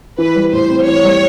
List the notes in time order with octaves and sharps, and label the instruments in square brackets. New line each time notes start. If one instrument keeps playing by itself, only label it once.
[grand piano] E3 [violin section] B4
[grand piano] G3
[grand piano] A2 [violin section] C5
[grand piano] C4
[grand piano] E3 [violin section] C#5
[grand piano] G3